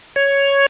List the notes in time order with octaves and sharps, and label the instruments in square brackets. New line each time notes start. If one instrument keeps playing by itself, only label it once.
[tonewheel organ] C#5